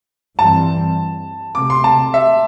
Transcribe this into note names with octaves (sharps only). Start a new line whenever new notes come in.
G2 E3 G3 C4 A5
C3 A3 C4 D6
C6
A5
E5